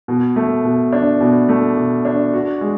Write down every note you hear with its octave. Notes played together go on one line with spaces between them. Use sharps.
B2
A3
B2
D4
B2
A3
B2
D4
F#4
G#3